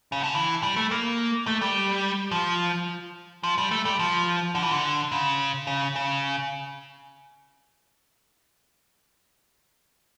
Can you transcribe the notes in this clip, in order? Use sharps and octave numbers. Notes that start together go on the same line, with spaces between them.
C#3
D3
E3
G3
A3
A#3
A3
G3
F3
F3
G3
A3
G3
F3
D3
E3
D3
C#3
C#3
C#3